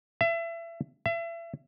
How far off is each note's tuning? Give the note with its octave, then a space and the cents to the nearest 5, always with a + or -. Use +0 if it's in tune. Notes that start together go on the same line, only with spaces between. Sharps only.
E5 +30
E5 +35